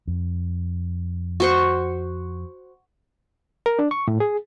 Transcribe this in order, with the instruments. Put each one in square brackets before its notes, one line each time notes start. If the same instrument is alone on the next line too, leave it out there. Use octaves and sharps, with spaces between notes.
[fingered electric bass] F2
[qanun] F#4 C5 C#6
[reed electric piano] A#4
D4
C#6
A2
G#4